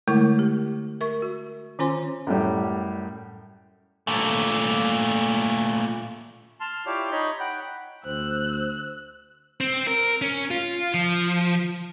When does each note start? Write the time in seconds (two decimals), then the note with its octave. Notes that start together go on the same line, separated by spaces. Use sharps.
0.08 D3 G#3 A3 E4 A#4 C#6
0.39 G4
1.01 A#4 E5 C#6
1.22 F#4
1.79 D#3 C#4 F4 C5 G#5 C6
2.27 F#2 A2 G3
4.07 A#2 A3
6.61 A5 C6 F6
6.86 E4 F4 G4 C#5 D5 F5
7.11 D#4 C#5 D#5 B5 G6
7.40 F#5 G5 B5
8.05 D2 C5 E6 F#6
9.60 C4
9.87 A#4
10.22 C#4
10.51 F4
10.94 F3